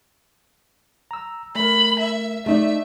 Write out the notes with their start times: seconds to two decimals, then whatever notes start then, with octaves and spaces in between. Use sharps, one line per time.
1.11 A#5 E6
1.56 A3 A#4 B5
2.00 E5
2.46 A3 D#4 D5 E5